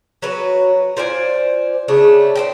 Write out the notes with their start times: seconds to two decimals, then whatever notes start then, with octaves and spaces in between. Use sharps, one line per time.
0.22 F#3 F#4 B4
0.97 F4 C5 D5 G#5
1.88 C#3 A3 D4
2.35 C5 D#5 G5